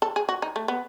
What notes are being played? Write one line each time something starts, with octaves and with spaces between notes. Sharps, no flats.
A4
G#4
F#4
D#4
A3
B3